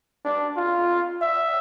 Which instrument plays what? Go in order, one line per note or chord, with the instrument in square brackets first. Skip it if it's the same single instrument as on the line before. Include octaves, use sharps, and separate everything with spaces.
[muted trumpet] D4
F4
E5